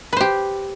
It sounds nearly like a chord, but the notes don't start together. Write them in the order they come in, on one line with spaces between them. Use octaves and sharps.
B4 C5 G4